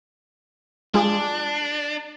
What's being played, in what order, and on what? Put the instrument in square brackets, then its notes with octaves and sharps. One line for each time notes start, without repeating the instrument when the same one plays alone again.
[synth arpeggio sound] G#3 F4 G#4 [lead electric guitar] D4